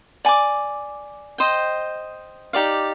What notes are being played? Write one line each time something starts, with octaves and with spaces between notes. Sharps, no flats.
D5 G#5 D6
C5 D#5 G5
D#4 G4 D5 F5